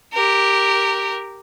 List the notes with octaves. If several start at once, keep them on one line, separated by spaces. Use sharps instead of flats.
G4 A#4